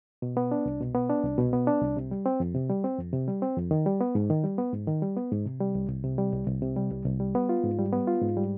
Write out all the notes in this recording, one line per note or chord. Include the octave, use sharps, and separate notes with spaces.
B2
B3
D4
C2
B2
B3
D4
C2
B2
B3
D4
C2
C3
G3
C4
F2
C3
G3
C4
F2
C3
G3
C4
F2
D#3
G3
B3
G#2
D#3
G3
B3
G#2
D#3
G3
B3
G#2
C3
G3
C2
C2
C3
G3
C2
C2
C3
G3
C2
C2
G3
B3
F4
G#2
G3
B3
F4
G#2
G3